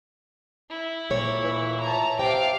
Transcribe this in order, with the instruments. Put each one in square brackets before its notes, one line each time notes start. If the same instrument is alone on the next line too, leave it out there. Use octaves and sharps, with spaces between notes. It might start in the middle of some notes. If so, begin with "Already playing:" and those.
[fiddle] E4
[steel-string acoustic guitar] D2 A#2 C#5
[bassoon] E3
[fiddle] A5 A#5
[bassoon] C3 [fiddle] F5 D6 [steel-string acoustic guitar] G5